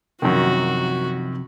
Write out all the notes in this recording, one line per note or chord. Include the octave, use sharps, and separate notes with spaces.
F#2 C3 D#3 F3 F#4